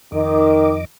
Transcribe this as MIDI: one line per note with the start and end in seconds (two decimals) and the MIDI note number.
0.12 0.85 41
0.12 0.77 51
0.12 0.85 75
0.12 0.85 86